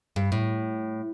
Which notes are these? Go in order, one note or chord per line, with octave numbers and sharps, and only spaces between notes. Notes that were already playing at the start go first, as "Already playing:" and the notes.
G2
A2